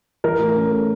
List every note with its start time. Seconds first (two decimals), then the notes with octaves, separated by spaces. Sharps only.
0.24 E3 A#4
0.39 A2
0.56 C#4
0.71 A3